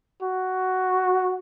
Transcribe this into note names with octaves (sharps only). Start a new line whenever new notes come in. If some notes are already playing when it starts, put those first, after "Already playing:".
F#4